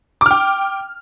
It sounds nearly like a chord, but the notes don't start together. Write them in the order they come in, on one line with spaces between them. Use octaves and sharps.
D6 F6 G5